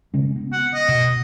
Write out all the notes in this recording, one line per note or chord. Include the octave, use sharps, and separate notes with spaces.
C#3 G#3 C#4
B3
F#5
D#5
B2